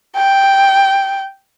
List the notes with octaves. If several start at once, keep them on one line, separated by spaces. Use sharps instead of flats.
G5